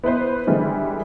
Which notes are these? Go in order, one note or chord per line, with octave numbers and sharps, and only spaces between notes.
B3 E4 B4 C5
D3 E3 G3 G#3